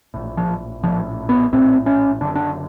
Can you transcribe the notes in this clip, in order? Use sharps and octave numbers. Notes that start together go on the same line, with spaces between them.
A#1 A2
F3
A#1 A2 F3
B3
A#1 A2 C4
C#4
F#1 F#2 D3 D4
D4